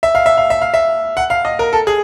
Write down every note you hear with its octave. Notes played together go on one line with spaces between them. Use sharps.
E5
F5
E5
F5
E5
F5
E5
F#5
F5
D#5
A#4
A4
G#4